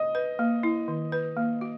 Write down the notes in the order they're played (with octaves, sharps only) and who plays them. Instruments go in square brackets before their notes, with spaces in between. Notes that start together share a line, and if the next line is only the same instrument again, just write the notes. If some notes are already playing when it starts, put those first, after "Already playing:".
Already playing: [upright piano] D#5
[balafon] B4
A#3
E4
D#3
B4
A#3
F#4